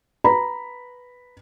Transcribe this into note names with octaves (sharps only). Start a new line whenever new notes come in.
B4 A#5 B5